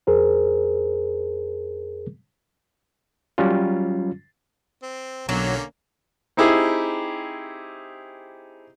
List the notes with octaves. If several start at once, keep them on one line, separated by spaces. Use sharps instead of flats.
F2 G#4 A#4 C5
F#3 G3 C#4 F4
C4
B1 D3 F#3 A#3 C#4
C4 D#4 E4 G4 G#4